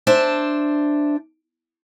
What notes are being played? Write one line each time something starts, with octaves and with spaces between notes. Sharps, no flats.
D4 C5 E5